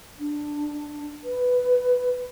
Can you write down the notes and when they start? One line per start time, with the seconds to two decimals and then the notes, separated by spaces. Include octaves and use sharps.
0.19 D4
1.24 B4